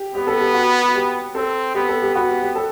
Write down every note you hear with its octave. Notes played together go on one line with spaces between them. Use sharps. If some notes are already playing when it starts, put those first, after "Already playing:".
Already playing: G4
B3 G4
A4
G4
F#4
F#4
G4
C4 A4
B3 G4
A4
G4
B3 F#4
G4
G4
A4